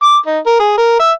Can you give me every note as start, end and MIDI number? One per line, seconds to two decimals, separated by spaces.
0.02 0.17 86
0.26 0.39 63
0.46 0.57 70
0.60 0.76 68
0.78 0.95 70
0.99 1.11 76